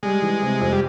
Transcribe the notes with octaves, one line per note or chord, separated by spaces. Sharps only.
G3 G#3
E3
C3
F2
G3